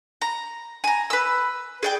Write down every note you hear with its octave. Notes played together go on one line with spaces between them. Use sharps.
A#5
G#5 A#5
B4 E6
G#4 D5 G5